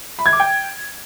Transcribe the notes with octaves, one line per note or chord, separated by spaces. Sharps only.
B5
G#6
D6
G5